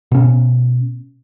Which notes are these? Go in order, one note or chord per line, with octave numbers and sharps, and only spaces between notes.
B2 C#4